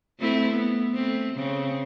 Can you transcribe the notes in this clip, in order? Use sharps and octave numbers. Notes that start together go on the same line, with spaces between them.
A3 C4 E4
B3
A3 C4
C#3 C4